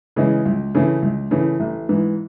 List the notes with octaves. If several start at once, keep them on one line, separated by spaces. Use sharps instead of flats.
C#3 E3 G#3
C#2
C#3 E3 A3
C#2
C#3 E3 A3
A1
G#2 E3